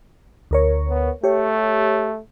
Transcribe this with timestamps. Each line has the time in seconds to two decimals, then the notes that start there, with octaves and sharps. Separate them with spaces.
0.51 D2 A#4 C#5
0.89 B3
1.23 A3 G4 C#5